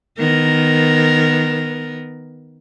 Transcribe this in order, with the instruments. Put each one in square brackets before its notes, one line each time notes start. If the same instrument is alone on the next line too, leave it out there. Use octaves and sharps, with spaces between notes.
[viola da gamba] D#3 B3 A#4